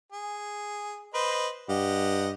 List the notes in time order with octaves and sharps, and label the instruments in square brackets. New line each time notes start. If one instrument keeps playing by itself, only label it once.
[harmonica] G#4
B4 C5 D#5
[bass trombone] G2 [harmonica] G4 D#5 F#5